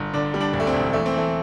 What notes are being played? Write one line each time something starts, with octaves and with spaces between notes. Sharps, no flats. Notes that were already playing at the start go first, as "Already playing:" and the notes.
Already playing: G1
D3 D4
G3
D4
D2
A3
C4
E1
E3 A3
C4
E3 A3